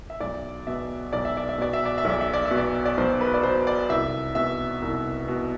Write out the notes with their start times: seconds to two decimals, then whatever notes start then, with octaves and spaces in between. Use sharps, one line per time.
0.10 E5
0.20 B1 D5
0.67 B2 E5
1.13 B1 D5
1.25 E5
1.37 D5
1.49 E5
1.58 B2 D5
1.73 E5
1.85 D5
1.98 E5
2.05 B1
2.10 D5
2.21 E5
2.33 D5
2.45 E5
2.51 B2
2.58 D5
2.86 D5
2.97 B1 C5
3.21 B4
3.34 D5
3.43 B2 C5
3.67 D5
3.89 C2 E5
4.35 B2 E5
4.82 C2
5.28 B2